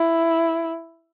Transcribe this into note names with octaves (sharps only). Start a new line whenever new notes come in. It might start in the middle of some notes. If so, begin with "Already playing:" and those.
Already playing: E4